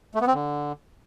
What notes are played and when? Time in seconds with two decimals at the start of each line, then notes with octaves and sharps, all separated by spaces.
0.15 A3
0.21 B3
0.27 C4
0.34 D3